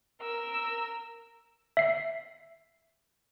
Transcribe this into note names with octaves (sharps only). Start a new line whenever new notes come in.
A#4 E6
E5 C7